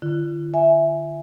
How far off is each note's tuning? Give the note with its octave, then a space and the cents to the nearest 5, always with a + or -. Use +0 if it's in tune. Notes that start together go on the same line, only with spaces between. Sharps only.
D3 +30 F4 -45
E5 +0 G#5 +0